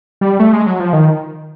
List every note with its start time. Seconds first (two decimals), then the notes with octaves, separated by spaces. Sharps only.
0.21 G3
0.40 A3
0.53 G#3
0.66 F#3
0.80 F3
0.93 D#3